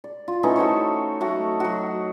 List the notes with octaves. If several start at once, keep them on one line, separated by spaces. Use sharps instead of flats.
D5
F4
E3 A3 C#4 D#4
F#4 A4 C5 C#5
F#3 A3 F#4
F#3 F#4